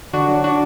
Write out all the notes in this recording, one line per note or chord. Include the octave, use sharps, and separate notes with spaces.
D3 D4 F#4
F#3
D4 F#4